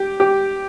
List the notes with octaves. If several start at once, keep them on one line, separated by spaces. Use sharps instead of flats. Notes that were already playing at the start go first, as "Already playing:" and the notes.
Already playing: G4
G4